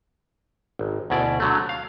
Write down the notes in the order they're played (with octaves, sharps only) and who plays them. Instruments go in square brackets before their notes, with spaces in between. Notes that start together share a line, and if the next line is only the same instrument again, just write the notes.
[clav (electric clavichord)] G#1
D2 B2 E4 D5
D3 F#3 A3
F5